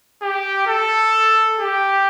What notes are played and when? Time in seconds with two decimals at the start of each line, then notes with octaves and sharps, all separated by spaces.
0.22 G4
0.67 A4
1.60 G4